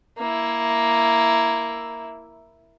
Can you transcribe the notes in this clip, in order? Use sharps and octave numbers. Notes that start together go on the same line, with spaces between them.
A#3 E4